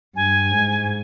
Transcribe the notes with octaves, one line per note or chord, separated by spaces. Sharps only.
G2 G#5
G#2